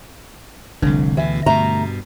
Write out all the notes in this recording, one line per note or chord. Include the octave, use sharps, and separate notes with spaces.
F1 C2 D3
D2 B2 E3
G2 B2 A3 A#5